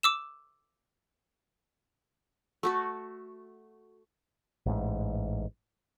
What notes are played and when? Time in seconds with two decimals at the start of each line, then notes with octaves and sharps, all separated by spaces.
0.03 D6 E6 E7
2.63 A3 F#4 A4
4.66 A1 G#2